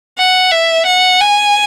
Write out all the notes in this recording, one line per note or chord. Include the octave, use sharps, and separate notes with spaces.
F#5
E5
F#5
G#5